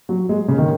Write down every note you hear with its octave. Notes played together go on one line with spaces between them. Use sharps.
F#3
G#3
C#3
D#3